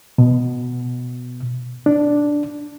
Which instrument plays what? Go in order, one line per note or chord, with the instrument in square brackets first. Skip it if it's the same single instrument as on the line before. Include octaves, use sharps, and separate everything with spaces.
[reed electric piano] B2
D4